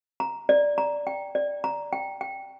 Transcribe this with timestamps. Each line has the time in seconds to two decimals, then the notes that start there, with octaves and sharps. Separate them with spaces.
0.20 A#5
0.49 D5
0.78 A#5
1.07 G5
1.35 D5
1.64 A#5
1.93 G5
2.21 G5